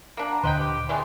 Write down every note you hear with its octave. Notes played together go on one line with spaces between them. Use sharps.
A#3 D4
F#5 A#5 B5
D2 A#2 D3 B4 C5 D#5 G5
G4
E3 G#3 A3 C5 D5 E5 G5